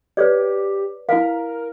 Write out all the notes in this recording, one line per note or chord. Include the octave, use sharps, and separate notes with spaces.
G4 B4 C#5 D5
E4 A#4 F5